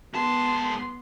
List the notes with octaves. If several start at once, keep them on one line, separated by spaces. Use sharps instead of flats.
G#2 B3 A5 C6